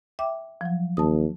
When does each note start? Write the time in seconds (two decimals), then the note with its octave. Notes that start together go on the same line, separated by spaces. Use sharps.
0.19 E5 G5 D6
0.61 F3 F#3
0.97 D#2 A5 D#6